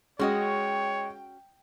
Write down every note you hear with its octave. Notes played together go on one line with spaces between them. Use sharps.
G#3 C#4 F#4 C#5 D#5 G5